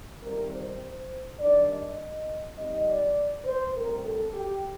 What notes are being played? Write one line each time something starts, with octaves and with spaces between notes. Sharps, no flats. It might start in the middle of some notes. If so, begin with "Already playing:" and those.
F2 C3 D#3 G3 C4 A#4
C5
D#3 G3 D4 D5
D#5
C3 G3 C4 D#4 D#5
D5
C5
A2 G3 C4 A#4
A4
G4